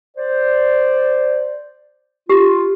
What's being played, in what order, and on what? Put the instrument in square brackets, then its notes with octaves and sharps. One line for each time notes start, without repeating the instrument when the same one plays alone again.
[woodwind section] C5 D5
[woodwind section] F4 [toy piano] G4